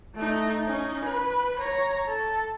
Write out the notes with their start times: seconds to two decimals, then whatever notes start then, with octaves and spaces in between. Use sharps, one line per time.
0.16 A3 D#4
0.66 C#4 D#4
1.05 B4
1.59 C#5 A#5
2.08 A4 A5